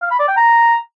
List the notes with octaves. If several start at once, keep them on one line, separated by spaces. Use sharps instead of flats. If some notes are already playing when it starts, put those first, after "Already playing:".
F5
B5
D5
G5
A#5